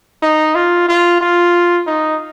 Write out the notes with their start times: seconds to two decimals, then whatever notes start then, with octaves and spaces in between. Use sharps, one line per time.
0.22 D#4
0.55 F4
0.88 F4
1.21 F4
1.87 D#4